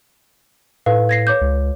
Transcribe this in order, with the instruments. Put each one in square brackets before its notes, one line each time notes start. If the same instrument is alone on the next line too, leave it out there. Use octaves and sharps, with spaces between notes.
[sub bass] A2 [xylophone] A4 B4 F5
[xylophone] G#6 A#6 C7
C#5 D6 G6
[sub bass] C#2